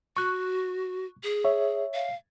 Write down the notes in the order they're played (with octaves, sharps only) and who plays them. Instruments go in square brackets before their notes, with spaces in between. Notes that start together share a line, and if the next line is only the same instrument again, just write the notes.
[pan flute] F#4 [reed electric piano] C#6 F#6
[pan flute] G#4
[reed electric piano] C#5 E5
[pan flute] F5